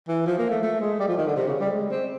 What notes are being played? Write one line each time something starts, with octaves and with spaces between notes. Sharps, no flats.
E3
F3
A#3
A3
A3
G#3
G3
F3
D#3
D3
C3
C#3
G3
G#3
C4